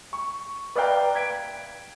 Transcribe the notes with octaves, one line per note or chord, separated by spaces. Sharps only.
C#6
B4 D5 E5 F5 G5 A#5
G#6 B6 D7